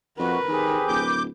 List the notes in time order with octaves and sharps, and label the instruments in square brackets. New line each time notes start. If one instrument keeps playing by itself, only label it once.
[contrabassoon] F2 [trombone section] F#4 [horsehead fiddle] A#4 B4
[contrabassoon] D#3 [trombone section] C4 G4 G#4
[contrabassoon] D1 [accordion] D6 G6